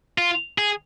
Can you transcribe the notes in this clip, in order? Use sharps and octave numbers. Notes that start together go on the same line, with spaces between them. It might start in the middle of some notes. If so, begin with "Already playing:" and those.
F4
G#4